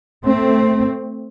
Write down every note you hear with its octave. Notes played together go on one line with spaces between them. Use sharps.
A3 C4